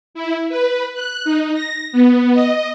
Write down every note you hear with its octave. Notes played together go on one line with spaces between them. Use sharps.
E4
B4
F#6
D#4
A#6
B3
D#5